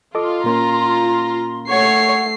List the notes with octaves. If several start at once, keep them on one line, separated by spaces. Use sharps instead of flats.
F4 A4 D#5 D6
A#2 A#3 C#4 A#5 C6
A3 C#5 F#5 C7